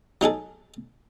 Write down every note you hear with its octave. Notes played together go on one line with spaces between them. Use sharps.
F#3 D#4 G#4 A4